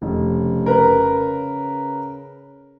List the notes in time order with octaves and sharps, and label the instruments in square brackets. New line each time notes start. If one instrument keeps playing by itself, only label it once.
[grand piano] F1 [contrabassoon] C#3
[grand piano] A#4 B4